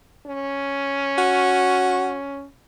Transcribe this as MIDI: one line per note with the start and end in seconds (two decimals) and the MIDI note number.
0.27 2.46 61
1.18 2.17 66